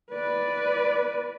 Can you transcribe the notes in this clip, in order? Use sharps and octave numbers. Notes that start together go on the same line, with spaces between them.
B4 D5